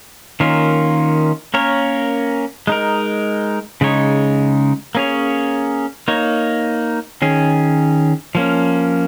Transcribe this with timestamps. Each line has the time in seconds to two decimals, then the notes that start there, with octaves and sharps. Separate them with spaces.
0.40 D#3 A#3 C#4 F4
1.54 A#3 C#4 A#4 C#5
2.67 G#3 D#4 A#4
3.81 C#3 G#3 D#4 C#5
4.95 A#3 C#4 G#4 C#5
6.08 A#3 D#4 C#5
7.22 D#3 C#4 G#4
8.35 F3 A#3 C#4